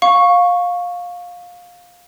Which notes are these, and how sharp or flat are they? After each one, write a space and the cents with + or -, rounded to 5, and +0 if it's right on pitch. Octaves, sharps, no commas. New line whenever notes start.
F5 +20 C#6 +0